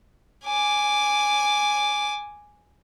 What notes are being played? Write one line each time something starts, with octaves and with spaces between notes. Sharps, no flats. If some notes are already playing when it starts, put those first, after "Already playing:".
G#5 D6